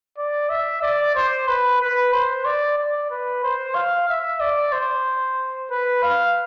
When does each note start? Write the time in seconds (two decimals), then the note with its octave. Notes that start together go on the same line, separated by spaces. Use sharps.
0.18 D5
0.49 E5
0.82 D5
1.15 C5
1.47 B4
1.81 B4
2.13 C5
2.45 D5
2.78 D5
3.10 B4
3.43 C5
3.75 F5
4.09 E5
4.40 D5
4.72 C5
5.71 B4
6.03 F5